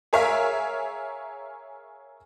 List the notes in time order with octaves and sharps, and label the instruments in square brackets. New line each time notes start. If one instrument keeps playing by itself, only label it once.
[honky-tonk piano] G#4 A#4 C#5 E5 F5